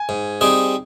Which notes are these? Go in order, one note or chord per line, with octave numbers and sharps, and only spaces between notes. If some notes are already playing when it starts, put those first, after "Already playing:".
Already playing: G#5
G#2
G3 C4 D#4 G#4